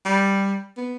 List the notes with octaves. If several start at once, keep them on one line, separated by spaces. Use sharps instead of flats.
G3
B3